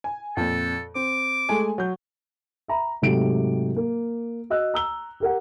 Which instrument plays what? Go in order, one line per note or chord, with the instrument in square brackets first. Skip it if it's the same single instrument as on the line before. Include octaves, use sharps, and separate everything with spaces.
[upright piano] G#5
[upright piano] F2 A#2 [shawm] A4
[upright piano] C4 [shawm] D6
[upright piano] G#3 A3 G#5
F#3 G6
[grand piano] E5 A#5 B5
G#2 C3 F#3 A3 G4 D7
A#3
F#4 D#5 E6 F#6
A#5 E6 G7
G4 A#4 F#5